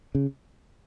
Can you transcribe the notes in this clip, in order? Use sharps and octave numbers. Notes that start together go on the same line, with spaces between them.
C#3